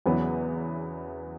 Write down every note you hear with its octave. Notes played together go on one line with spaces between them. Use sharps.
E2 C#3 F#3 B3 E4